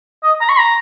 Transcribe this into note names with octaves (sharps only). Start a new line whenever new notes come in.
D#5
A#5
C#6
A#5